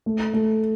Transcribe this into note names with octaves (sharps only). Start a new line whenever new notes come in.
A3
A3